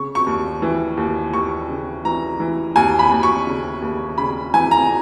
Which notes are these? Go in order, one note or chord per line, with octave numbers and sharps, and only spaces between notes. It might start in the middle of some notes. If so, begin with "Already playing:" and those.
Already playing: C#3 C#6
C#6
D#2
E3
D#2
D#2 C#6
C#3
E3 A#5
E3
D#2 G#5
B5
D#2
C#6
C#3
D#2
C#3 B5
E3 G#5
A#5